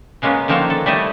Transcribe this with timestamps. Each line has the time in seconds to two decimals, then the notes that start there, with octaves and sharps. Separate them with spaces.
0.22 C#3 G#3 A#3 B3 C#4
0.48 D3 D#3 F3 A#3 C#5 A5
0.70 A4
0.86 G3 A3 E4 D#5